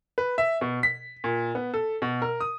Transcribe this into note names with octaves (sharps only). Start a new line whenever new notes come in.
B4
E5
B2
B6
A#2
B3
A4
B2
A#4
D#6